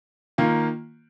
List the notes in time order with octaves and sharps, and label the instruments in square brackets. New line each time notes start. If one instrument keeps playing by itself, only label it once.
[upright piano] D#3 A#3 F4